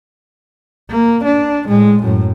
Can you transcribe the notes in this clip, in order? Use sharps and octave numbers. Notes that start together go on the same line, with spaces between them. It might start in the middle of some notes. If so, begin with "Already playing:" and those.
A#3
D4
A2 G#3
F#2 A2